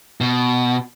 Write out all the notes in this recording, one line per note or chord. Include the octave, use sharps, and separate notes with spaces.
B2